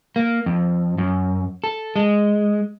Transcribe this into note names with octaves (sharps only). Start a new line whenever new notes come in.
A#3
F2
F#2
A4
G#3